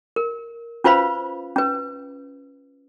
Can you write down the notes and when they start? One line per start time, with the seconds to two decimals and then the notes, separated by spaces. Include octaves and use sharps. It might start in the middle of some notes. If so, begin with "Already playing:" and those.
0.16 A#4
0.84 C#4 F4 B4 C5 F5 B5
1.56 C#4 B4